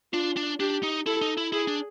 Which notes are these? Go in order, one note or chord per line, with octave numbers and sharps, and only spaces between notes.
D4 F4
D4
D4 G4
D#4
E4 A4
D#4
E4
E4 G#4
D4